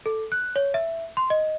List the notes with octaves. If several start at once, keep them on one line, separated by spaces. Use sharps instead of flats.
A4
F#6
C#5
E5
C6
D#5